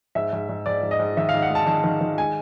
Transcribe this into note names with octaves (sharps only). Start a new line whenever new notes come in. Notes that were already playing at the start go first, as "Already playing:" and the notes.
G#2 E5
G#2
G#2
G#2 D5
G#2
D#5
G#2
D#3 E5
F5
G#2
F#5
G#3
A5
D#3 A5
D#3
D#3
G#3 G#5